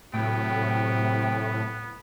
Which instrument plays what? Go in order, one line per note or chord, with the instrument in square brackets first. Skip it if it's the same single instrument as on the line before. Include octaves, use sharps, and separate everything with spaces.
[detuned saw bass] A2 [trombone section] C3 F#3 [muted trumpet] B3 [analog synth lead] G5